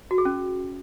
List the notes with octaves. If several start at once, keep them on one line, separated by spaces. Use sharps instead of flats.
F#4
G#4
C#4